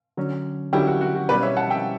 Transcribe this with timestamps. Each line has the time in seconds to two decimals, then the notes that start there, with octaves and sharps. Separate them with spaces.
0.17 D3 F#3 C#4
0.73 D3 F#3 C#4 E4 G4
0.87 F#4
1.01 F#4
1.15 F#4
1.29 B2 G3 C#4 E4 G4 B4 D5
1.43 C#5 E5
1.57 F#5 A5
1.70 E5 G5